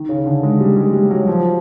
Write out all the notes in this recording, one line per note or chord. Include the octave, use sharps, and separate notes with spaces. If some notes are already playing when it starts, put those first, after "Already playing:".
Already playing: D#3
C#3
D3
G#3
G3
G#3
G3
F#3
F3